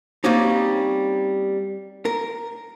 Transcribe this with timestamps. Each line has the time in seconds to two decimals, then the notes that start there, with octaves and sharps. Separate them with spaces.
0.24 G3 A#3 C4 C#4 D#4
2.05 A#4